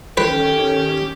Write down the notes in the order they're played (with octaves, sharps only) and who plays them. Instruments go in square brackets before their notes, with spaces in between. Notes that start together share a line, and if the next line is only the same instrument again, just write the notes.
[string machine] D#3 C#4 [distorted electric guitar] G4 [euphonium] A4 [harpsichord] B4